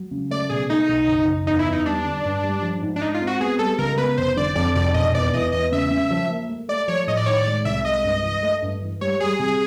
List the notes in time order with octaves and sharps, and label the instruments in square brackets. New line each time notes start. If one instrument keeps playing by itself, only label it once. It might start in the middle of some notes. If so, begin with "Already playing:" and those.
Already playing: [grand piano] F#3
C#3
[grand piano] A3 [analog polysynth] D5
[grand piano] B2 [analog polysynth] G#4
[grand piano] A3 [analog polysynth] D#4
[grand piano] B1
F#1
F#1
[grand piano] E2 [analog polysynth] D#4
[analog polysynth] E4
[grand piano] E2
[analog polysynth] D#4
[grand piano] G3 [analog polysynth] D4
[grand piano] D3
G2
G3
F3
G#2
[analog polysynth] D4
[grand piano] G#3 [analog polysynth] D#4
[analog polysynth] F4
[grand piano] C4
[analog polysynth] F#4
[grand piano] B3 [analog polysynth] G#4
[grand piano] G3 [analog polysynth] A4
[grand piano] C#2 [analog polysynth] A#4
[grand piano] B3 [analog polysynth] B4
[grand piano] F1 [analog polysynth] C5
[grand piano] D3 [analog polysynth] D5
[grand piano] F2 [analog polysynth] D5
[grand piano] F1 [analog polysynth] D5
[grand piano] E1 [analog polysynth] D#5
[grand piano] E2 [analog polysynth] D5
[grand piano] E3 [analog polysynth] D#5
[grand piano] E2 [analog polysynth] D#5
[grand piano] C#3 [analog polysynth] E5
[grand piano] C#3
F3
A#3
A3
[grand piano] A3 [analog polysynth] D5
[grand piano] F3 [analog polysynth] C#5
[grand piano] A2 [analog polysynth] D#5
[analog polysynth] D5
[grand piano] D#3 [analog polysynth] C#5
[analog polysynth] D5
[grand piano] G#3
[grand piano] C2 [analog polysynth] E5
[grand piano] G#3 [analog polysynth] D#5
[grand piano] G2
E3
A3
G2
E3
[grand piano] G3 [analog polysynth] C#5
[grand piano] G3 [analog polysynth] G#4
[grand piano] C3